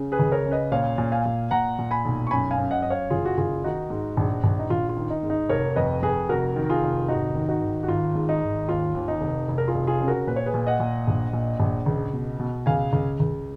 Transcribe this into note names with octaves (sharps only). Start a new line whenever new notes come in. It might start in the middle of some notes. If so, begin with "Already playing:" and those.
Already playing: C#3
G#4 B4
C#2
A#4 C#5
C#3
B4 D#5
A#2 C#5 F5
A#2
F5 G#5
A#2
A#2 F#5 A#5
A#2
G#5 B5
B1
C#6
F#2 G#5 B5
F5 G#5
F#2
D#5 F#5
F#2 D#5
C#5 F5
F#1 F4 G#4
F#4
F#1 F4 G#4
D#3 D#4 F#4
G#2
A#1
A#1
D#4
A#1 F4
F4
D#3
D#4
G#2
D#4
F1 A#4 C#5
F2 B4 D#5
F2 G#4 B4
F1 F#4 A#4
D#3
F4 G#4
F1
G#1 D#4 F#4
D#3
D#4 F#4
G#1
F#4
G#1 F4
G#2
D#4
G#1
D#2 F4
D#2
D#4
F1
F1
A#4
F4 G#4
F1
F4 G#4
C#3
F#4 A#4
A#2 B4
C#5
G#4 B4
A#2
D#5 F#5
A#2
A#1
A#2
A#1
C#2
B2
B2
C#2 F5 G#5
C#2
C#2